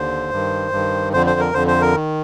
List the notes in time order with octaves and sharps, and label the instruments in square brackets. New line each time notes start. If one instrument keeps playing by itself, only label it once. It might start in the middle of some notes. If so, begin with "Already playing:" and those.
Already playing: [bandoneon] D#2 D3 C5
G2 D#3
G2 D#3
F2 D3 C5
C5
A#4
F2 D3 C5
C5
A#4
D#3